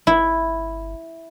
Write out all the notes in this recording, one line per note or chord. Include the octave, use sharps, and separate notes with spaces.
G1 E4